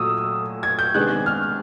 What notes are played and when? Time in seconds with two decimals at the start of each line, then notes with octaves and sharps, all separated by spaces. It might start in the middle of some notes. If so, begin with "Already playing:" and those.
Already playing: A#2 F#3 A3 D#6 E6
0.63 G#6
0.79 G6
0.94 C3 D#3 G#3 B3 D4 F#6
1.26 F6